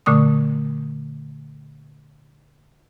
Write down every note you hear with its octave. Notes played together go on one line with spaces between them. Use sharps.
A#2 D3 A3 C#6 D#6